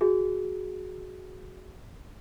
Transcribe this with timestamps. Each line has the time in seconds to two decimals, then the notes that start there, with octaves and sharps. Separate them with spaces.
0.01 F#4 G#4